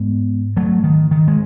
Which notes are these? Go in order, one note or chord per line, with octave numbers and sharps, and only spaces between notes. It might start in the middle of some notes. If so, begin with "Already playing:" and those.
Already playing: G#2 G#3 B3
F#3 A3
D#3
D#3
G#3